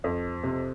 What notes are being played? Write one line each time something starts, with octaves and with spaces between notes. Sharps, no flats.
F2
C3